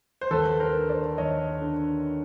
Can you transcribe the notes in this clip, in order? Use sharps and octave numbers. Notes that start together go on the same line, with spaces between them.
C5
D#2 A4 B4
A#4 C5
D3
C5 D5
D#2 C#5 D#5
D3